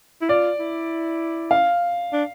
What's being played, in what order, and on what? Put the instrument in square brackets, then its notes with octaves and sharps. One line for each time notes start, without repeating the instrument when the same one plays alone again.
[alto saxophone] E4
[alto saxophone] F4 [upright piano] D5
[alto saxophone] E4
[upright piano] F5
[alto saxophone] D4